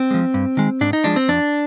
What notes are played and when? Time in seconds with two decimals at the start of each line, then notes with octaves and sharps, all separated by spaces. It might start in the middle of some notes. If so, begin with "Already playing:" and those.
Already playing: C4
0.11 F3 G#3
0.34 G2
0.57 D#3 G#3
0.81 G#2 D4
0.93 D#4
1.04 F3 G#3 D4
1.16 C4
1.28 F2 D4